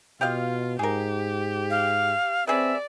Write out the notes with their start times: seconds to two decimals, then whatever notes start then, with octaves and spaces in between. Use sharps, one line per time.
0.21 B2 F4 G4 D#5 F5
0.79 G#2 G4 G#4 A#4
1.70 F5
2.47 C4 C#4 G#4 B4 D5 E5